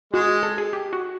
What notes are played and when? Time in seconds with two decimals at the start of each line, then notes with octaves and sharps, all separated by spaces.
0.14 G#3 F#4
0.43 A4
0.58 G#4
0.73 G4
0.93 F#4